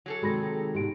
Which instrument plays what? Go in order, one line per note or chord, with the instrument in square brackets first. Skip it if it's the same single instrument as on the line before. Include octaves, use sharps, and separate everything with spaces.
[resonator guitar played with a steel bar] F#3 G#4 A4
[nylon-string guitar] C3 D#3 G#3 [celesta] F#4 B5 A#6
[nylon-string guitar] G#2 B2 [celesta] G4 D7